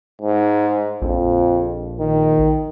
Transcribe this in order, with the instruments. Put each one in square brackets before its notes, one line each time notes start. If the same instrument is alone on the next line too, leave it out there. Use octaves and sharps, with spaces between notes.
[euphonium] G#2
[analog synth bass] A#1 [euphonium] F2
[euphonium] D#3